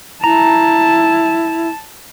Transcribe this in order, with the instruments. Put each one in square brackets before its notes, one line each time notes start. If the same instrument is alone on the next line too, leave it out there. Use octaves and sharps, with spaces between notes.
[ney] E4 [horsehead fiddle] A5 [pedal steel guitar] A#5